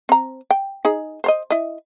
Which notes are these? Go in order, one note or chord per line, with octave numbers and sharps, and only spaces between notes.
C4 A#5
G5
D#4 G#4
C5 C#5 D#5
E4 D#5